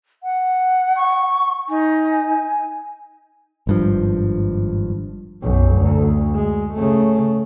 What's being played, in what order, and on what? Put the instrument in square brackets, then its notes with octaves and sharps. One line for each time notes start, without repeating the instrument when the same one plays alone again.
[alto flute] F#5
[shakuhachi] C#6
[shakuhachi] D#4 [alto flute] G#5
[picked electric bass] G#1 G2 F3
[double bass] B1 F#2
D2
G#3
C#3 A3